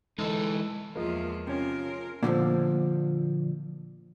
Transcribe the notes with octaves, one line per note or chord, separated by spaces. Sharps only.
E3 G#3 D#4 A4
E2 F3 G#3 A#3 F4
C3 C#4 F4 A#4
A#2 D3 E3 F3